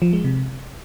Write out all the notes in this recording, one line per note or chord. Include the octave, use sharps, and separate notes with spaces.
F3
G#3
C3